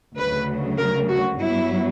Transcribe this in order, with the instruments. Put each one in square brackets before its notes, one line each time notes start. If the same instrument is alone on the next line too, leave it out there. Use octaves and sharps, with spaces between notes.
[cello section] D2 C#3 F#3 B4
A#4
F#4
G2 F#3 B3 E4